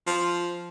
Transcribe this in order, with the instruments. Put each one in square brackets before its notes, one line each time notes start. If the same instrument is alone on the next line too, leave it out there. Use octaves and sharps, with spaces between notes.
[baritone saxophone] F3